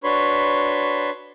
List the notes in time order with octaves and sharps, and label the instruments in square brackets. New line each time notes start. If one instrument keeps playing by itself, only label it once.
[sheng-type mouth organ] D4 F#4 B4 C#5 B5 C6